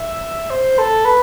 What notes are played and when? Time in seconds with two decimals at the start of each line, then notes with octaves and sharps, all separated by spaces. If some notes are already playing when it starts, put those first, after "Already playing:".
Already playing: E5
0.50 C5
0.78 A4
1.05 B4